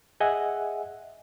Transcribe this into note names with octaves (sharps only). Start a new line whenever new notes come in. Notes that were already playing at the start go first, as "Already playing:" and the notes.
G#4 D#5 E5 F#5 G#5 F#6